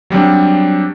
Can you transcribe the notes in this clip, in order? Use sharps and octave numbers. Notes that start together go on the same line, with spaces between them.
F#3 G3 C4 D4